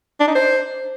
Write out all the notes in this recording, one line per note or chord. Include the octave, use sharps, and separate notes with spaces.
D4
D#4
C5